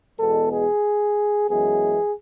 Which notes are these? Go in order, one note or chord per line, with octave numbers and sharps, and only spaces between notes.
E2 B2 G#3 B3 A4
G#4
F#2 E3 G#3 B3 G#4